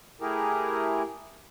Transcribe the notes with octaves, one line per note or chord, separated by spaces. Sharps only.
A3 E4 G4 G#4 A#4